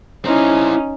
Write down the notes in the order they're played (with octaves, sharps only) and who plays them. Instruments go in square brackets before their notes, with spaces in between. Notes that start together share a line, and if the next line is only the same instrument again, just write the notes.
[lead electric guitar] C4 E4 [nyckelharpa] C#4 D#4